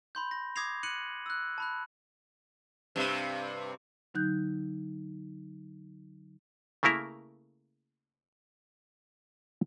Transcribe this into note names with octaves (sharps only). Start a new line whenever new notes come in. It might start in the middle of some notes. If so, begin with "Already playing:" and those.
B5 C6 G6
A#6
D6 D#6 G#6 A#6 C7 F7
F#6 C#7 D#7 F#7
E6 F#6
A5 B5 F#6
G2 C3
D3 F#3 D#4 F#6 G6
C#3 A3 A#3 E4 A#4